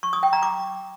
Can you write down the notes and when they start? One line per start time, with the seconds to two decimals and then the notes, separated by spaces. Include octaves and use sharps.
0.03 C#6
0.13 D#6
0.23 G5
0.33 A#5
0.43 D6